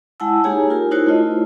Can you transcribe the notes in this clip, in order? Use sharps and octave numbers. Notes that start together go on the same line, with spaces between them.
G#3 E4 F#5 G#5 A5 E6
A#3 D#4 G4 G#4 C#5 G#5
F4 G4 A#4
D#4 E4 F#4 A#4 C5 C#5
A3 E4 F4 D#5